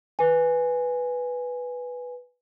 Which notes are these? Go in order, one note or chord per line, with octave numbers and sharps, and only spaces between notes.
B4 G#5